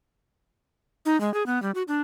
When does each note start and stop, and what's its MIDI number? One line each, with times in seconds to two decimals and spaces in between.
1.05 1.19 63
1.21 1.32 56
1.34 1.45 68
1.46 1.61 59
1.62 1.71 55
1.75 1.83 66
1.88 2.02 62